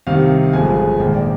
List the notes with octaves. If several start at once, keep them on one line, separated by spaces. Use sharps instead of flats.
C2 C3 D#3 F5
G1 G2 F3 G#3 G#5
A#1 G#2 D#3 A#3 G5
D5